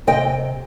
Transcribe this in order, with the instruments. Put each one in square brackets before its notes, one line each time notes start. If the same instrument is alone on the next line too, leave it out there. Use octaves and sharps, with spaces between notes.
[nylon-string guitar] C3 D#5 G5